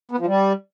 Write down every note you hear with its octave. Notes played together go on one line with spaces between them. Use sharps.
B3
F3
G3